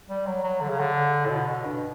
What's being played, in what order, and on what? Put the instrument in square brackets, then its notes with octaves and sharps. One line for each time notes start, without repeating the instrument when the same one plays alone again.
[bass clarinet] G3
F#3
F#3
D3
C#3
D3
A2
B2
B2
G2